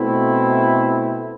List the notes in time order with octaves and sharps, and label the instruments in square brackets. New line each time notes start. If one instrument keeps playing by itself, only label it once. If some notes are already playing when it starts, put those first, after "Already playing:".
Already playing: [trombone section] B2 A3 C4 E4